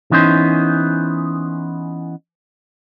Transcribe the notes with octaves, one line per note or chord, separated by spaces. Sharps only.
E3 B3 C#4 D#4 C5